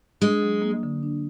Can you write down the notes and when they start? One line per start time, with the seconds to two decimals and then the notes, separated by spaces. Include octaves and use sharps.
0.21 G#3 D4
0.42 F#3
0.62 A#3
0.83 D3
1.03 D4